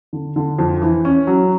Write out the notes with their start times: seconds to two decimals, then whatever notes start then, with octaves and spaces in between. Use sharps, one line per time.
0.13 D3
0.36 D3
0.59 F2
0.82 E3
1.05 C#4
1.27 F#3